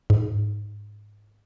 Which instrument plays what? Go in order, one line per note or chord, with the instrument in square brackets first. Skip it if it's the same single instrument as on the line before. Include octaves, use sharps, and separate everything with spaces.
[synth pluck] G#2